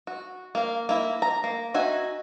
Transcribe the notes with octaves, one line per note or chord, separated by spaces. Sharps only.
F#4
A#3 F5
A#3 E4
A#5
A#3
D#4 F#4 E5 G#5